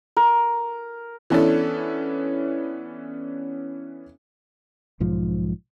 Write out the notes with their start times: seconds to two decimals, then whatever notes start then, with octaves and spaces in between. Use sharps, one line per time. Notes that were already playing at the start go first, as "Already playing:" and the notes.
0.17 A#4
1.30 E3 B3 C#4 D4 E4 A4
5.00 B1 G#2 F3